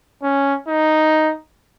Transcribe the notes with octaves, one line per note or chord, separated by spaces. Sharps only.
C#4
D#4